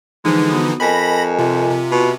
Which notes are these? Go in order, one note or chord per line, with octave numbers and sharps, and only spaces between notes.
D3 E3 F3 G#3 D#4
B3 F#4 D#6
F2 A#4 D#5 G#5 B5 A#6 B6
C3 F4
C3
B2